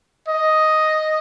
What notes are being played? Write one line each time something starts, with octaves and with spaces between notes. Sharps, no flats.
D#5